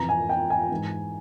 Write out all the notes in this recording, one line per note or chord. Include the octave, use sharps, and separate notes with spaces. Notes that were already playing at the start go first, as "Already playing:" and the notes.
Already playing: F2 C3 E3 A#5
G#5
G5
G#5
G#2 E3